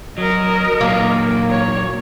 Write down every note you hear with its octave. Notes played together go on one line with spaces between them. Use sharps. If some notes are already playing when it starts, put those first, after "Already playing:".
F#3 A#4 D#5
A#2 F#3 A#3
C#5